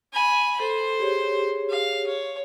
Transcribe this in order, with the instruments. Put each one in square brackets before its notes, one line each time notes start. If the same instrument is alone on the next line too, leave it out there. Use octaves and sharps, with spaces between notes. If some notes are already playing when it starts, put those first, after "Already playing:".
[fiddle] G#5 B5
[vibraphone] A4 [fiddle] C5
[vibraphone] G4 G#4 C#5
[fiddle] F5
C#5